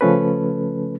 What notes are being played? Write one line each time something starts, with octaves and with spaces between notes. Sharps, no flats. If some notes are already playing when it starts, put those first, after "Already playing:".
C#3 F3 A3 C#4 A4 B4